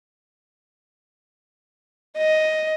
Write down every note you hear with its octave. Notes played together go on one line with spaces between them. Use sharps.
D#5